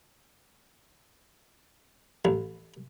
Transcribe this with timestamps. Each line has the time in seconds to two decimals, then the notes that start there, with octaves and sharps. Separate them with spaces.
2.25 A1